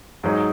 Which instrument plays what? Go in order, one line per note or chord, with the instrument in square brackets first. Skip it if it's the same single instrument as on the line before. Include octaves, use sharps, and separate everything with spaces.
[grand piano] G#2 F#3 D#4 G#4